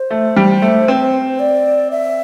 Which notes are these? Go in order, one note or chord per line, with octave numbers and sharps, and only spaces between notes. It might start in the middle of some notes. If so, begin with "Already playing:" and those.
Already playing: C5
A3
G3
A3
C4
D5
E5